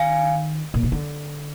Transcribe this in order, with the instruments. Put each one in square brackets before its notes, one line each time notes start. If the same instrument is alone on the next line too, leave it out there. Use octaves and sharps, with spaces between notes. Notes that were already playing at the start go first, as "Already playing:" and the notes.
Already playing: [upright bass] D#3 [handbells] F5 G#5
[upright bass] A#2
C3
D3